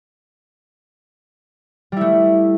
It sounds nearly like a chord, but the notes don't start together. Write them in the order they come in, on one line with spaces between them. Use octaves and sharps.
G3 E4 A3